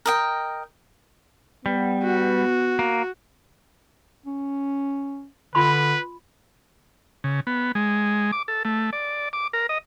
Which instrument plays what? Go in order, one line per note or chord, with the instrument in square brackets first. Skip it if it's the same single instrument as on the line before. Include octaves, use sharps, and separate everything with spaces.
[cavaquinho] A#4 D#5 G5
[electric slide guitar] G3 [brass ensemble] B3
[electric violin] F#4
[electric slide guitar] A#3
[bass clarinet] C#4
[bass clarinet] D3 [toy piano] F4 B5 C6 [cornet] B4
[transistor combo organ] C#3
B3
G#3
D6
A4
A3
D5
D6
A#4
D#5